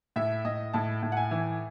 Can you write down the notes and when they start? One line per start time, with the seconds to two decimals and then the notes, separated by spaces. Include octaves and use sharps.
0.16 A2 E5
0.45 A2 D#5
0.73 A2 A5
1.03 A2
1.12 F#5
1.17 G#5
1.31 E3